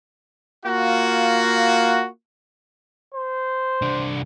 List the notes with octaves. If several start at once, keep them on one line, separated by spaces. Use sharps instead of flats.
A#3 F4 F#4
C5
C2 D4